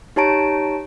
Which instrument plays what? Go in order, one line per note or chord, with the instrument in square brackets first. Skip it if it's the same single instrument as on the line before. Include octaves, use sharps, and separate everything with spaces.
[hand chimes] D#4 G4 C#5 A5 A#5 D7